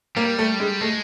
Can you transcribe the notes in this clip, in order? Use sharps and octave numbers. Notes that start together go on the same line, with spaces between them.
G3 A#3
A3
G#3
G#3 A3